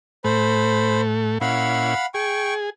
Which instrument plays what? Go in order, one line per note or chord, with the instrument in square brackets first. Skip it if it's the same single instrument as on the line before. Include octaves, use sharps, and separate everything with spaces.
[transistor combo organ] A2 A3 [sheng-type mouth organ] C5 B5
[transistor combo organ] A#2 C#4 E4 [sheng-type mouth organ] F5 F#5 B5
[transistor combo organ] G#4 [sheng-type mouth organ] G5 C#6